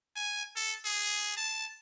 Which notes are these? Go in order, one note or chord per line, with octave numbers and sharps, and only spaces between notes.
G#5
A4
G#4
A5